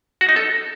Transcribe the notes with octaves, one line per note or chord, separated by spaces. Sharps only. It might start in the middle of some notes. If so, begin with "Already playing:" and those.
F#4
D#4
A4